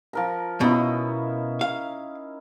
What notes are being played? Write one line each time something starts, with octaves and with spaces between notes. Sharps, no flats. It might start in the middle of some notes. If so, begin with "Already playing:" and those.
F3 A#4 A#5
B2 C#4 D#4 E4
F5